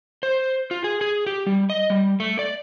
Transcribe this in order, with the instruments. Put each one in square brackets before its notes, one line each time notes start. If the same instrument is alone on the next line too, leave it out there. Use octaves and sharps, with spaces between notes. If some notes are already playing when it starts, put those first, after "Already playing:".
[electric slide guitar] C5
F4
G#4
G#4
G4
G3
D#5
G3
A3
D5